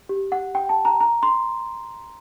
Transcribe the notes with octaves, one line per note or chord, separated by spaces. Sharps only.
G4
F#5
G5
A5
A#5
A#5
C6